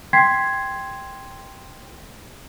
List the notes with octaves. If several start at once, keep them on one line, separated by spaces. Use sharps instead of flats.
G5 C6 G#6 B6 C7